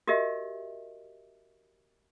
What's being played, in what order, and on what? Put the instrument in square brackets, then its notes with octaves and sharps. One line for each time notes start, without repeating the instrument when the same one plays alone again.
[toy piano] F#4 G4 A#4 D#5 E5